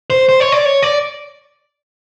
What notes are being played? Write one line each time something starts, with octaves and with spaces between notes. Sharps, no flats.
C5
C5
C#5
D5
C#5
D5